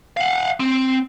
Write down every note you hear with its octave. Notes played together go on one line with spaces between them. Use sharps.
F5 F#5
C4